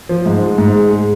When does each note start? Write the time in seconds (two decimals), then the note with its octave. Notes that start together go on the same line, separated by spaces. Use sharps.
0.09 F3
0.26 G#2
0.42 G#3
0.58 G#2
0.74 G#3
0.91 G#3